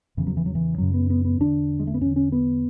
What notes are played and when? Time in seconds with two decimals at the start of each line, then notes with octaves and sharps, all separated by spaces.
0.17 E2 C#3 E3
0.27 F#3
0.37 E3
0.46 F#3
0.55 E3
0.78 F#2 C#3 F#3
0.94 B3
1.10 B3
1.25 B3
1.40 E2 D3 D4
1.79 G#3
1.87 A3
1.94 B3
2.01 E2 D3 C#4
2.16 C#4
2.32 B3